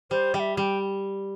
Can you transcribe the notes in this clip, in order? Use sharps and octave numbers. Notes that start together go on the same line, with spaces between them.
G3 C5
G3 G5
E5
G3 G5